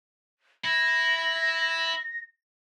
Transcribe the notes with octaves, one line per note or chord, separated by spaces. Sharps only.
E4 A#6